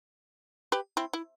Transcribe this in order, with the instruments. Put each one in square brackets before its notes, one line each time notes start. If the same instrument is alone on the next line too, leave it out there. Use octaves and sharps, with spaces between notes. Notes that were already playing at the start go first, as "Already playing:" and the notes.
[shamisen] G4 B4
C4 E4
E4